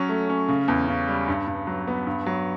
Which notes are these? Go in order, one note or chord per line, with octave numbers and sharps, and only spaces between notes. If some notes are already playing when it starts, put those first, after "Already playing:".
Already playing: F#3 C#4
A3
C#4
C#3
E2
C#3
G3
G2
G2
F#3
B3
G2
F#3